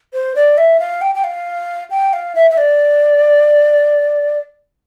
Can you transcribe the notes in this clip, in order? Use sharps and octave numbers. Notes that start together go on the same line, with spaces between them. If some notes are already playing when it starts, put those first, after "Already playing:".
C5
D5
E5
F5
G5
G5
F5
G5
F5
E5
E5
D5